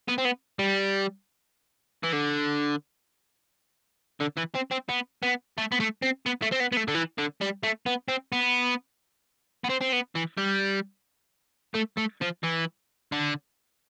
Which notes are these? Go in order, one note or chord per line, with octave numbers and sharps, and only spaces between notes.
B3
C4
B3
G3
E3
D3
D3
E3
C4
C4
B3
B3
A3
B3
A3
C4
B3
A3
C4
B3
B3
A3
D3
E3
D3
G3
A3
B3
C4
B3
B3
C4
C4
B3
E3
G3
A3
A3
F3
E3
D3